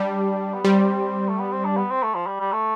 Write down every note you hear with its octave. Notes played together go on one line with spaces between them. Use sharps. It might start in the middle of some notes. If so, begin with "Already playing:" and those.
Already playing: G3 D4
B3
G3 C4
A3
B3
C4
D4
B3
C4
A3
F3
G3
G3
A3